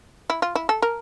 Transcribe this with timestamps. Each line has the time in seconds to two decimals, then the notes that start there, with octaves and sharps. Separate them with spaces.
0.30 E4
0.42 F4
0.55 E4
0.69 A4
0.82 A#4